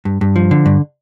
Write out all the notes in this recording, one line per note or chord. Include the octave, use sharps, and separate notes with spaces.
G2
G2
F3
D3
G2